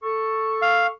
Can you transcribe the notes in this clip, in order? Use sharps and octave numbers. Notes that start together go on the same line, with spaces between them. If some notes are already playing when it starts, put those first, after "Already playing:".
A4 C#6
F5